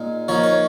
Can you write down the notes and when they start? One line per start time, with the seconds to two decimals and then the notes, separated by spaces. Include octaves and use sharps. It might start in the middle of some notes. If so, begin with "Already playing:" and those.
Already playing: A#2 G#3 D#4
0.28 F3 A#3 D#4 C#5
0.43 C#5